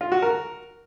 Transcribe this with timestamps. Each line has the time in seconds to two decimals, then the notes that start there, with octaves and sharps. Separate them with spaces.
0.01 F4
0.12 F#4
0.22 A#4